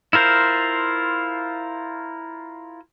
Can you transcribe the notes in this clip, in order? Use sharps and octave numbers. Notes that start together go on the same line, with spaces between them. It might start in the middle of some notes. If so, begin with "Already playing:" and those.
E4 F4 A#4 C5